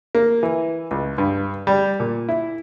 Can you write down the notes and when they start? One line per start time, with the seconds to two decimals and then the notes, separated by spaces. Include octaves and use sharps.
0.15 A#3
0.43 E3
0.91 C#2
1.18 G2
1.67 G3
2.00 A#2
2.29 E4